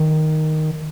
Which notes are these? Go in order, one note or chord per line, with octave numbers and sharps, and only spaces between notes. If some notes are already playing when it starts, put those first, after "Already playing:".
Already playing: D#3